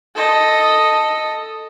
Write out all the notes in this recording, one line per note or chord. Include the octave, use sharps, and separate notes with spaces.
A4 D#5